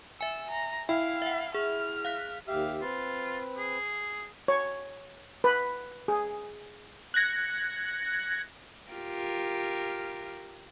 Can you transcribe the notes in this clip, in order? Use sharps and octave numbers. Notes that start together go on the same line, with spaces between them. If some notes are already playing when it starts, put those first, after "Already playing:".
E5 G#5 E6
A#5
E4 F5 G5
E5 F#5
G#4 F6
F5 F#6 B6
D#2 G4 E5 F5
C4 F4 B4
G#4
C#5
B4
G#4
F#6 G#6 A#6 C#7
F4 G4 A#4